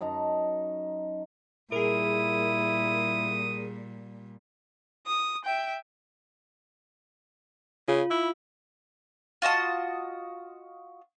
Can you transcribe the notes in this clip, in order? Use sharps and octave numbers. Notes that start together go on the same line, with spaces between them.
F#2 D#4 A5 A#5
A#2 G3 E4 G#4 A#4 D#6
D#6
E5 G5
C#3 F4
E4
F4 F#4 D#5 A5